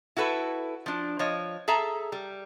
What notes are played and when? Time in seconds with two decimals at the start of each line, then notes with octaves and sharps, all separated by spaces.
0.17 E4 F#4 A4 B4
0.86 F3 D4
1.19 F3 C#5 D#5
1.68 G#4 A4 E5 A5 A#5
2.12 G3